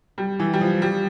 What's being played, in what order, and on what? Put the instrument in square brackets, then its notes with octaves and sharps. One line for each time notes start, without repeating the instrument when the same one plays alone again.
[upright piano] G3
E3
G3
F3
G3